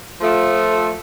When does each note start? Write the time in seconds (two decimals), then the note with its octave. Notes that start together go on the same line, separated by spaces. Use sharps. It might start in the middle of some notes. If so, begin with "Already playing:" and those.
0.21 F3 A3